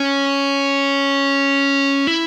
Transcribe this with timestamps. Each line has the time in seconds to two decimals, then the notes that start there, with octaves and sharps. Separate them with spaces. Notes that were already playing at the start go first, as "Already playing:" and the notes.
Already playing: C#4
2.07 E4